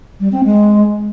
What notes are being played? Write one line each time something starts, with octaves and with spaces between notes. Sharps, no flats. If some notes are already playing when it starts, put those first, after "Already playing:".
G3
C4
G#3